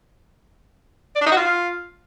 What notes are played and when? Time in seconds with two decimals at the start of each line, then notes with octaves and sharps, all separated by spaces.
1.16 D5
1.21 D4
1.26 D#4
1.32 F#4
1.37 F4